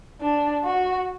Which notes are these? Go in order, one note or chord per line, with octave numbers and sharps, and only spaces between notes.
D4
F#4